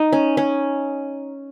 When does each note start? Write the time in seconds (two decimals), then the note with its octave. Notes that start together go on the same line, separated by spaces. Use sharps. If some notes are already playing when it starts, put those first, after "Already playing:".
Already playing: D#4
0.13 C#4
0.37 C#4